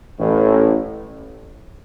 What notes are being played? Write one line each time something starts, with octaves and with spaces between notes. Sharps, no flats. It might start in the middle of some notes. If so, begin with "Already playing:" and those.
A1 A2